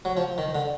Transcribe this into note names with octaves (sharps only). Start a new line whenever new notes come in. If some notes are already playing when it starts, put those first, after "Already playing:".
F#3
F3
D#3
D3